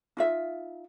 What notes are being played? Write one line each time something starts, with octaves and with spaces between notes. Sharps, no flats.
D#4 F4 E5